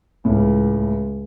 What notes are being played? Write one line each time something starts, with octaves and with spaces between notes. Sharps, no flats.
C#2 A2